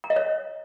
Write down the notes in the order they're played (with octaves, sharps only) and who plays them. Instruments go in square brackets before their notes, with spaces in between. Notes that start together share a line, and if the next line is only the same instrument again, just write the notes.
[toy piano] A#5
D#5
C#5